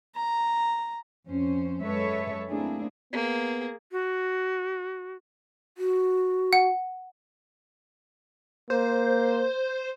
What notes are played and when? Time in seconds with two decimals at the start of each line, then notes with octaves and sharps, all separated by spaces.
0.15 A#5
1.27 F2 C#4 C5
1.83 F#2 G#3 A4 B4 C#5 E5
2.49 A3 A#3 C4 D4 E4 G#4
3.13 A#3 B3 G#4
3.92 F#4
5.78 F#4
6.53 F#5
8.70 A#3 C5